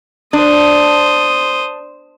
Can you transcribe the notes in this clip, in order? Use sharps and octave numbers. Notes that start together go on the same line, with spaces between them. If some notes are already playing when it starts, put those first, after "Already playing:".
D4 C5 D#6